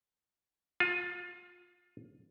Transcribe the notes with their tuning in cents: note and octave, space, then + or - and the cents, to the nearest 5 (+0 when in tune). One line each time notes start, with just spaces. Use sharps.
F4 +25